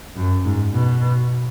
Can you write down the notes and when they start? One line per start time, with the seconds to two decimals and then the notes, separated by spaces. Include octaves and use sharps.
0.16 F#2
0.45 G#2
0.73 B2